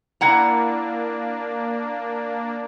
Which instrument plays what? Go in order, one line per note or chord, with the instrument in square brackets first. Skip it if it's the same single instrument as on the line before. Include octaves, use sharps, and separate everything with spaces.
[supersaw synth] A#3 D4 [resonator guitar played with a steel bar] E4 F#5 A#5